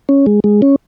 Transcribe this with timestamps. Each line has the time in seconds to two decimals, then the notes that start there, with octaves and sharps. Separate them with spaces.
0.09 C#4
0.26 G#3
0.44 G#3
0.62 C#4